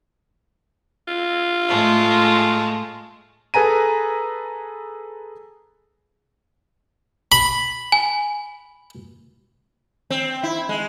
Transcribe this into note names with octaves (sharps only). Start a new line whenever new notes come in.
F4
A2 G#3 A3
G#4 A4 B4 G#5 A#5 D#7
B5
G#5
C4
E4
G#3